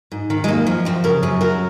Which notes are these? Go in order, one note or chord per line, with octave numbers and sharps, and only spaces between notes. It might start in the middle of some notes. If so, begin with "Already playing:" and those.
G#2
D#3
G#3
F#2 A#3
F3
F#2 C4
C#3 A#4
F#2 G#4
F#3 A#4